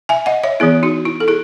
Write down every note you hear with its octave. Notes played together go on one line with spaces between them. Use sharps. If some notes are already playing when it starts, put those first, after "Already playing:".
E5 G#5
D#5 F#5
C#5 E5
E3 B3 E4 G#4
D#4 F#4
E4
A4
E4 G#4